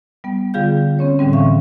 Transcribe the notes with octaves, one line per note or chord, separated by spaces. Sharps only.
G3 B3
D3 G3 F4 G#4 F5 G6
C4 C#4 C#5
A2 D3 E3 G3 C4
E5 F5 C#6